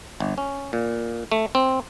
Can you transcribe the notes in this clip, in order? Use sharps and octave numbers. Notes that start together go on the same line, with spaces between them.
G1
C#4
A#2
A3
C4